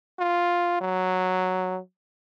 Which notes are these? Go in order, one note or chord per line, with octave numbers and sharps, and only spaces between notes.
F4
F#3